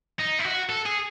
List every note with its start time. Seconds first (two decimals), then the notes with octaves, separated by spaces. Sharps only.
0.19 D#4
0.39 E4
0.45 F#4
0.70 A4
0.86 G#4